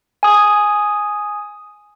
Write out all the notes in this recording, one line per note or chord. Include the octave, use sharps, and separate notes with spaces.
G#5 D#6